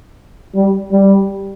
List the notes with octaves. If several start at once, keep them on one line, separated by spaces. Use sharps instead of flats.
G3
G3